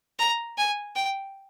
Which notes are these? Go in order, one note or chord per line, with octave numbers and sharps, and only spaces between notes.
A#5
G#5
G5